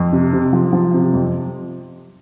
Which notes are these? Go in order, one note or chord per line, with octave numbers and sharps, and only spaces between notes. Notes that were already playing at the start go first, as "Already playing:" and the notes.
Already playing: F2
C3
C3
F3
F3
C3
F2